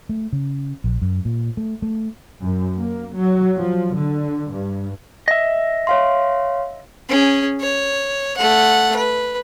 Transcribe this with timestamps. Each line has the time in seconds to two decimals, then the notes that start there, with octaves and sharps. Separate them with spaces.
0.09 A3
0.33 C#3
0.84 A#1
1.02 F#2
1.25 A#2
1.57 A3
1.82 A3
2.42 F#2
2.79 A#3
3.14 F#3
3.58 F3
3.96 D3
4.53 G2
5.28 D#5 E5
5.87 C#5 F5 C6
7.09 C#4 G#4
7.61 C#5
8.37 A3 F#5
8.96 B4